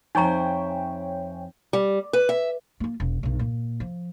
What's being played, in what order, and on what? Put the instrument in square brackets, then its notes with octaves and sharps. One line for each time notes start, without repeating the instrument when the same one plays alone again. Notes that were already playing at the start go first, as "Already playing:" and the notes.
[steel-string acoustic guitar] F2 C5 E5 [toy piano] D#4 A#5 [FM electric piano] C#5 G5 G#5
[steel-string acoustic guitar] G3
B4
E5
[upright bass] A#3 F4
E1
B1 G2
A#2
F3